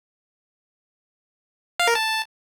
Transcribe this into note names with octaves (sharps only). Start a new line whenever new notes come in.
F5
A#4
A5